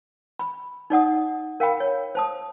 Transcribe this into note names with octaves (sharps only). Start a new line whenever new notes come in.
B5
D#4 D5 F#5 D#6
A#4 F5 G5 B5
C#5
C5 A5 D#6